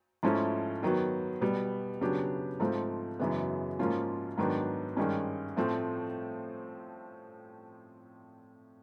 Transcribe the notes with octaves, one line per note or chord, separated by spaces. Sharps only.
G#2 F3 A3 C#4 E4
D#3 F#3 B3
B2 G3 B3
C#3 F#3 B3 D4 G4
G#2 F3 A3 C4 F4
F#2 C#3 E3 G#3 B3
G#2 F3 A#3 C#4 F4
G#2 D#3 F#3 B3 D4
G2 D#3 G#3 C#4
A2 F3 A3 C4